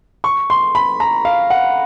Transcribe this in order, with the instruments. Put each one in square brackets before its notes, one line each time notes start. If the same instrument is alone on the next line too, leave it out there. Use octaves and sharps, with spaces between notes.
[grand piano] C#6
C6
B5
A#5
F5
F#5